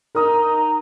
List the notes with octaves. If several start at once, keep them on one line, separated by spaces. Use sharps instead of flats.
D#4 A#4 D#6